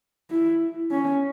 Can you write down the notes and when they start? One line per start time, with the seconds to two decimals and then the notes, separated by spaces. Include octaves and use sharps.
0.31 E4
0.91 C#4